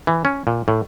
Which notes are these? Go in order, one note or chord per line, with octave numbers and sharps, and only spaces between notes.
E3
C#4
A#2
A2